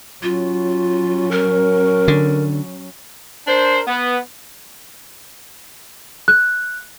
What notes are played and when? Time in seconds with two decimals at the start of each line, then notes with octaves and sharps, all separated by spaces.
0.23 F#3 C#4 F4
1.31 A#4
2.08 D3
3.48 D4 A#4 C5
3.87 B3
6.28 F#6